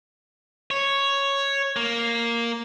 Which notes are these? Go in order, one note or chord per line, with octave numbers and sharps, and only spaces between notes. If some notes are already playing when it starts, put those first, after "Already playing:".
C#5
A#3